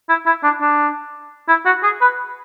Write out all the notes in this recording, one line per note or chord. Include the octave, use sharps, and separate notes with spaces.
E4
E4
D4
D4
E4
F#4
G#4
B4